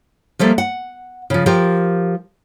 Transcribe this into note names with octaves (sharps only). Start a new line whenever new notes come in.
F3 G3 A3 A#3
F#5
C#3 F3
F3 G4 A#4